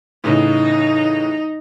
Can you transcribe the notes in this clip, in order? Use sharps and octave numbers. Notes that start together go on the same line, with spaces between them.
A2 C#3 E3 D#4